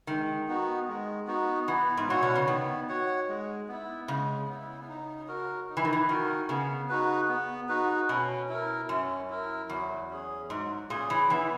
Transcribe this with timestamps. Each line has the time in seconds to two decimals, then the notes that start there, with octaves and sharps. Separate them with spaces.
0.07 D#3 G#3
0.48 B3 D#4 F#4
0.88 G#3
1.27 B3 D#4 F#4
1.68 E3 B3
1.97 G#2
2.08 A#2 F#4 C#5 F#5
2.23 B2
2.35 C#3
2.48 D#3 B3
2.89 F#4 C#5 F#5
3.28 G#3
3.68 B3 E4
4.08 C#3 G#3
4.48 B3 E4
4.89 D#4
5.28 F#4 A#4
5.69 D#4
5.77 E3
5.85 D#3
5.93 E3
6.09 D#3 F#4 A#4
6.49 C#3 B3
6.89 D#4 F#4 B4
7.29 B3
7.69 D#4 F#4 B4
8.09 B2 C#4
8.49 E4 A#4
8.89 F#2 C#4
9.30 E4 A#4
9.69 E2 F#3
10.10 C#4 G#4
10.50 G#2 F#3
10.90 A#2 C#4 G#4
11.10 E3
11.30 E3 B3